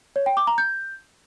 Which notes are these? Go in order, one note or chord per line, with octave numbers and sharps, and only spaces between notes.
C#5
G5
D6
A#5
G6